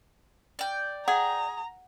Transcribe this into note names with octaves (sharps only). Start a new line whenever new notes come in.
D5 G5
G#4 F#5 A#5